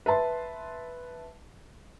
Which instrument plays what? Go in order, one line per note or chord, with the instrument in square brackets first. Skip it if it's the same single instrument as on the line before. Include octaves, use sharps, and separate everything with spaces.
[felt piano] B4 E5 A5 C6